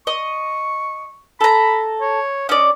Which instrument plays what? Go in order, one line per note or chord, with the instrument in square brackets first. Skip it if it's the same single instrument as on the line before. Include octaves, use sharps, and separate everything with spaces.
[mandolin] D#5 [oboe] C#6
[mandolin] A4 A#5 [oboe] B5
[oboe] C#5
[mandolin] C#4 D5 [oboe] D#5